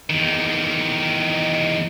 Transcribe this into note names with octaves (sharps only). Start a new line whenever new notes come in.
E2 D#3